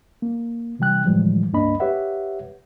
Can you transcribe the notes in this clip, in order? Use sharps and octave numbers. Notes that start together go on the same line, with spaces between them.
A#3
C3 E3 G3 G5 F#6
A2 D3 E3 F3 G3 G#3
C#2 G2 A#3 D4 D#5 B5
G4 B4 C#5 E5 F#5